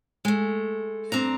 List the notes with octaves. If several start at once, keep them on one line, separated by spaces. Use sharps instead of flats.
G#3 A3
G2 C4 D4 A#5